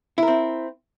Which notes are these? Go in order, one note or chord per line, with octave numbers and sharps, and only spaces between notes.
C4 E4 A#4